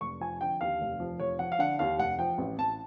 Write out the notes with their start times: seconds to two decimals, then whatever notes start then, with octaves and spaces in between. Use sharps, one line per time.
0.01 F1 C#6
0.21 F3 G#5
0.40 D3 G5
0.61 D#2 F5
0.81 F1
1.00 F3
1.20 F1 C#5
1.39 F3 F#5
1.52 F5
1.59 D3 F#5
1.79 D#2 F5
1.98 F1 F#5
2.19 F3 G5
2.38 A1
2.58 A1 A5